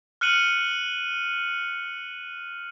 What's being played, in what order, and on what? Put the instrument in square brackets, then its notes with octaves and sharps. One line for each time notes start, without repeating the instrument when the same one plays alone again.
[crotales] F6 F#6 C#7 D#7 F#7